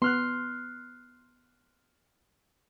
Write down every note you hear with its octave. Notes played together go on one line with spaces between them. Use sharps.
B3 C6 F6 F#6